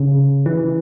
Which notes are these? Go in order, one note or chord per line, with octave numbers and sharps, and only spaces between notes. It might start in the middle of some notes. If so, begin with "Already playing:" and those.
Already playing: C#3
E3